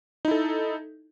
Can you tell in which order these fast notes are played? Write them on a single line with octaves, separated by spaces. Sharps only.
D#4 E4 A4